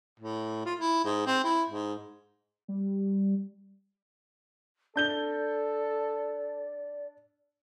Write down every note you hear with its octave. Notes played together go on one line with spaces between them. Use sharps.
A2
F4
E4
G#2
C4
E4
G#2
G3
D4 A4 D5 G6 G7